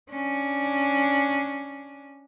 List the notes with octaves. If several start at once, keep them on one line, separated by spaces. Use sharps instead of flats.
C#4 D4